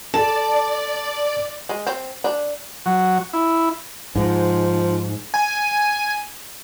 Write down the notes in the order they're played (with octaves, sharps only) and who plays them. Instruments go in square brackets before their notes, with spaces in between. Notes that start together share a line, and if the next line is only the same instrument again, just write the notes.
[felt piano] A4 [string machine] D5 [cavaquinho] A5
[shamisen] G#3
C4
D4
[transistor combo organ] F#3
E4
[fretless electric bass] G#2 [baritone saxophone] F3
[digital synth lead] G#5